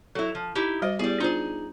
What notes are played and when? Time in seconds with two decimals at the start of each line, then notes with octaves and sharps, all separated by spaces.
0.15 F#3 E4 A4
0.35 F3
0.55 D#4 E4 G4
0.82 G3 F#4 C5 D#5
0.99 G3 B3 E4 G#4
1.20 D4 D#4 F4 G#4 C5